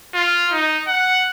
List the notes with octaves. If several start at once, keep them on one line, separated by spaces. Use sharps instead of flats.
F4
D#4
F#5